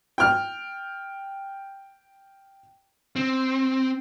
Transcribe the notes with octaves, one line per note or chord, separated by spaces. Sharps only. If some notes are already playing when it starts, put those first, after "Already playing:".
G5 F6
C4